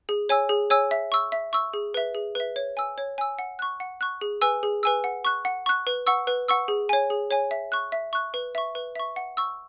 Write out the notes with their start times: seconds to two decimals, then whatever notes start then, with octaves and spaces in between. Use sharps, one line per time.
0.09 G#4
0.29 C#5 G#5 E6
0.49 G#4
0.70 C#5 G#5 E6
0.91 E5
1.12 C#6 E6
1.32 E5
1.53 C#6 E6
1.74 G#4
1.94 B4 E5
2.15 G#4
2.35 B4 E5
2.56 C#5
2.77 G#5 E6
2.98 C#5
3.18 G#5 E6
3.39 F#5
3.59 C#6 F#6
3.80 F#5
4.01 C#6 F#6
4.21 G#4
4.41 B4 G#5 E6
4.63 G#4
4.83 B4 G#5 E6
5.04 F#5
5.25 C#6 F#6
5.45 F#5
5.66 C#6 F#6
5.87 B4
6.07 F#5 C#6 E6
6.27 B4
6.48 F#5 C#6 E6
6.68 G#4
6.89 C#5 G#5
7.10 G#4
7.30 C#5 G#5
7.51 E5
7.72 C#6 F#6
7.92 E5
8.13 C#6 F#6
8.34 B4
8.55 E5 C#6
8.75 B4
8.95 E5 C#6
9.16 F#5
9.37 C#6 E6